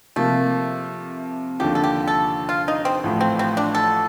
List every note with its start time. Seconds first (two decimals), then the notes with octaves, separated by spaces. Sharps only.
0.16 C3 F3 A3 A#3
1.60 D#2 D3 F3 G4
1.75 A4
1.84 G4
2.07 A4
2.49 F4
2.68 D#4
2.85 C4
3.03 A1 A2 F3
3.21 C4
3.39 C4
3.57 D4
3.75 A4